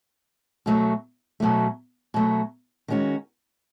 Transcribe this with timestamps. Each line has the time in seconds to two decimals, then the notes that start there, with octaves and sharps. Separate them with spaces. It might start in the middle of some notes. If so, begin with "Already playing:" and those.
0.66 B2 F#3 A3
1.40 B2 F#3 A3
2.14 B2 F#3 A3
2.88 D#3 G#3 C#4 F#4